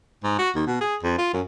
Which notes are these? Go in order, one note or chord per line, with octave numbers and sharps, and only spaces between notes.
G#2
F#4
D#2
B2
G#4
F2
F4
F#2